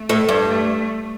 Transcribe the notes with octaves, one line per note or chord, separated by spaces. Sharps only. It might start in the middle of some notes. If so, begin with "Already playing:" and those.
Already playing: A3
A2
G2
A3